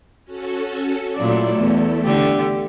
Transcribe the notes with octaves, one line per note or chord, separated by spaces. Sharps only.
C#4 F#4 A4
A#2 F#3 A3 E4 A4 D5
E2
D3 G4